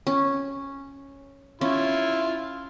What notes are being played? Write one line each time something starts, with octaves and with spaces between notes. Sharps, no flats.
C#4
C#4 E4 F4